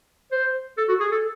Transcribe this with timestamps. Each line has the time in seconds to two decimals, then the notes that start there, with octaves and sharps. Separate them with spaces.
0.32 C5
0.78 A4
0.88 F#4
1.00 G#4
1.12 A4